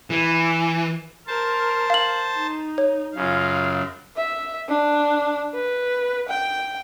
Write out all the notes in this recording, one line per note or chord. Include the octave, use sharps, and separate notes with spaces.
E3
A#4 C5 A5
F5 F#7
D#4
C#5
F#2 C#3 F4 F5
E5
D4
B4
G5